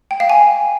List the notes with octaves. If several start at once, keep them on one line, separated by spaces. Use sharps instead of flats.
G5
F5
G#5